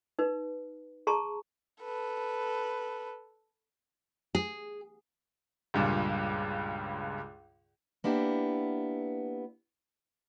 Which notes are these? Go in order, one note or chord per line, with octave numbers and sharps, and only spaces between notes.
D#4 B4
G#4 A5 A#5 C6 C#6
A4 B4
G#4
C#2 G2 A#2
A#3 B3 D4 E4 G4